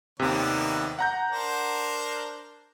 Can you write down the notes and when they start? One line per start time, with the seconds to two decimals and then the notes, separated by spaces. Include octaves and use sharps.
0.20 D#2 C3 D#3 B3 D5
0.99 F#5 A#5 G6
1.31 D4 A#4 C5